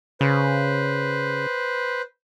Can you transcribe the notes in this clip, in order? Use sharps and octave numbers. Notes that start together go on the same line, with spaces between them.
C#3 B4 C5